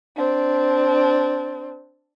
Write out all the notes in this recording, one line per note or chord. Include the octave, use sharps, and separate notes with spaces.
C4 D4